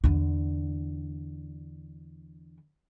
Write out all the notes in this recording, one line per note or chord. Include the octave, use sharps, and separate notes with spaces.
E2 D3